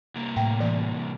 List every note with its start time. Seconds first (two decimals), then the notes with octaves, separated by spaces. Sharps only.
0.16 C2 A#3
0.36 A2 G5
0.60 E3 D5